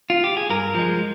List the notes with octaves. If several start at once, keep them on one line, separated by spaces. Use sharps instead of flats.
F4
G4
G#4
G2 A#4
F3 G#3